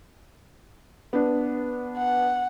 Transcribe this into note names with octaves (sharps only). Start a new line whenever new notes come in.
B3 D4
F#5